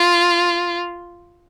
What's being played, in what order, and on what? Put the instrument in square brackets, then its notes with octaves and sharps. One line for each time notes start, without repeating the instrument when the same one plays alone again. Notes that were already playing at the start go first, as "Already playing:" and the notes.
Already playing: [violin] F4